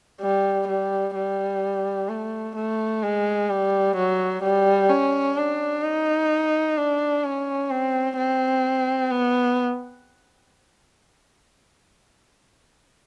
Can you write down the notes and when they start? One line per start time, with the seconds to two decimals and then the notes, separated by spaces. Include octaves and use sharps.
0.21 G3
0.68 G3
1.15 G3
2.09 A3
2.55 A3
3.03 G#3
3.49 G3
3.96 F#3
4.43 G3
4.90 C#4
5.37 D4
5.84 D#4
6.77 D4
7.24 C#4
7.71 C4
8.18 C4
9.12 B3